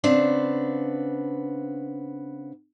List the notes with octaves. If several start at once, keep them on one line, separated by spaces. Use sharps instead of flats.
C#3 B3 C4 D4